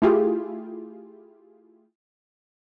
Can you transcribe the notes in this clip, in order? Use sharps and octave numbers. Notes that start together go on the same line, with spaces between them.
A3 E4 F4 G4 G#4